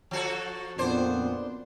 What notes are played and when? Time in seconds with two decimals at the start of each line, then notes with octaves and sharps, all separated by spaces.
0.11 F3 F#4 A4
0.78 F2 A#2 B3 C4 D4 C5